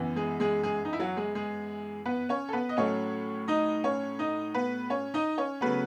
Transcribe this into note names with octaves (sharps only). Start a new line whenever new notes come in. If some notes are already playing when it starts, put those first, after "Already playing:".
Already playing: F#2 E3 B3
G#3 G#4
G#3 G#4
G#3 G#4
D#4
E4
F#3 F#4
G#3 G#4
G#3 G#4
B3 B4
C#4 C#5
A4
B3 B4
D#5
A2 F#3 A3 C#4 C#5
D#4 D#5
C#4 C#5
D#4 D#5
B3 B4
C#4 C#5
D#4 D#5
C#4 C#5
C#3 F#3 A3 B3 B4